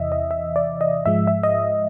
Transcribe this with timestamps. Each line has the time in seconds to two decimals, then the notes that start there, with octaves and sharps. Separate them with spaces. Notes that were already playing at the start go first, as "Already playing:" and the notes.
Already playing: E2 C3 E3 D#5 E5
0.12 D#5
0.31 E5
0.56 D5
0.81 D#5
1.06 G#2 F3 G#3 E5
1.27 E5
1.43 D#5